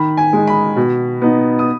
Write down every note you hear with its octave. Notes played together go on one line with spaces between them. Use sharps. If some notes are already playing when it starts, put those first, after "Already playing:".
Already playing: D#3 B5
G#5
G#3 D#4
B5
B2
B3 D#4
D#6